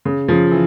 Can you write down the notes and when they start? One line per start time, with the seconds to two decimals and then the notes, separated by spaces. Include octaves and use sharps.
0.05 C#3
0.28 C#3 F3
0.51 E3